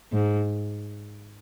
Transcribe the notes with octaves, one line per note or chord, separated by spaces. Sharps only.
G#2